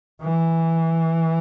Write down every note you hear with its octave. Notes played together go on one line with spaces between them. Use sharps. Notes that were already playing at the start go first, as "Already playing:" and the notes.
E3